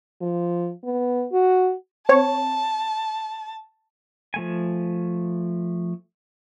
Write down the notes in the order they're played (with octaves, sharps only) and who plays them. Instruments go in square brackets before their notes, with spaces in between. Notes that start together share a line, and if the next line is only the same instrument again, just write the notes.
[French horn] F3
B3
F#4
[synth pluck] C4 C#5 [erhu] A5
[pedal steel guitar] F3 A3 G#5